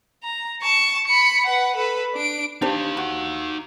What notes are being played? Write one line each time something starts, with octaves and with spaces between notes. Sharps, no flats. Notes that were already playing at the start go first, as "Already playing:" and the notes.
A#5
A5 C#6
B5 C#7
B4 F#5
A4 B4
D4 D7
D4 D#4 G4 C5 F5
F#4